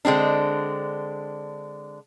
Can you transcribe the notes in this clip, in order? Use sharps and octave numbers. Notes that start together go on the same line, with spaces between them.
D3 G#3 C4 D4